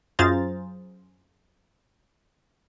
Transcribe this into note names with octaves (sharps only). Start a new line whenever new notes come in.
F#2 F4 G#4 C5 A#5 A6